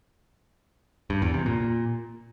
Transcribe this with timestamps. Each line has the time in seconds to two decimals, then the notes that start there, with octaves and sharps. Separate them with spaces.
1.10 G2
1.22 E2
1.34 C3
1.46 A#2